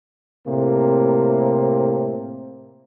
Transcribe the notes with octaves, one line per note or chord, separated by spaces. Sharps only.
A2 C3 A#3 C4